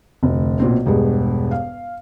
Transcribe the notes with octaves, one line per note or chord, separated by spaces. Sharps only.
F1 D2
B1 A#2 C4
E1 G2 G#3
F5